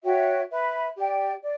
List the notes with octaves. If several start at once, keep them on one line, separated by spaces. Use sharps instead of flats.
F#4 C#5 E5 G5
B4 E5 B5
G4 D5 G5
D5